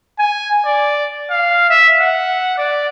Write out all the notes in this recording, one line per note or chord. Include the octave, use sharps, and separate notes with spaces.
G#5
D5
F5
E5
F#5
D5